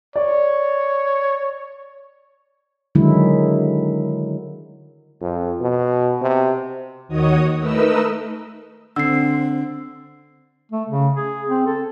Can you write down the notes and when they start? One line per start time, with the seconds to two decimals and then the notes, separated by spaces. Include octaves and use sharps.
0.16 C#5 D5
2.95 D3 D#3 F#3 G#3 E4
5.21 F2
5.61 B2
6.22 C3
7.08 D#2 D#3 F#4 C#5 D#5 D#6
7.59 A3 D#4 A#4 B4 D#5 E6
8.96 D3 C4 E6 C7
10.72 A3
10.89 C#3
11.13 G#4
11.47 C4
11.66 A4